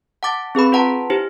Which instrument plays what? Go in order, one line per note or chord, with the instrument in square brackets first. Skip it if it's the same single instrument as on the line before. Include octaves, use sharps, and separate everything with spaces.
[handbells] F#5 A5 D6 A6
C4 G#4 B4 B5
F4 B4 F#5 A5 A#5 C6
D#4 E4 G4 C5